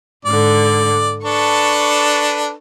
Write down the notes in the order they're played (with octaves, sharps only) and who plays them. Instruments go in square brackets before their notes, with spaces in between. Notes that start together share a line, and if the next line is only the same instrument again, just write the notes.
[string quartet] G#2 D3 [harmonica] D5
[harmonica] D4 A4 B4 [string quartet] C#6